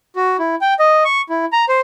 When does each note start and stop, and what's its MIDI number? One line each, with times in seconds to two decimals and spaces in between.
0.16 0.37 66
0.39 0.55 64
0.61 0.74 79
0.79 1.04 75
1.05 1.22 85
1.29 1.45 64
1.53 1.65 82
1.69 1.81 72